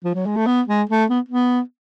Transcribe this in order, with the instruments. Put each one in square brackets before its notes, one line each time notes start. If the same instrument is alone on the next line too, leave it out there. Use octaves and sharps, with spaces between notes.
[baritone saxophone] F3
F#3
G#3
A3
B3
G#3
A3
B3
B3